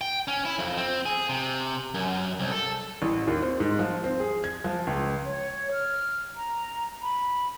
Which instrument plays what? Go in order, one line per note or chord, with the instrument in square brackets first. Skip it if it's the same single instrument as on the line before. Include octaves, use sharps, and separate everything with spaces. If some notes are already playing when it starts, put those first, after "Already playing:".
[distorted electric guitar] G5
C#4
E4
F2
C4
G#4
C3
F#2
C2
A4
[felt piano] A1
D#2
C4
G#2
F3
C4
G#4
G#6
F3
C#2
[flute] C#5
F6
A#5
B5